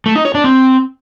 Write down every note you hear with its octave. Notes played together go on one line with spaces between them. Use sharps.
A3
D#4
C#5
D4
C4